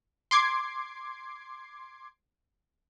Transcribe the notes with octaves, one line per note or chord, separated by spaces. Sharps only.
C6 D6 G#6 C7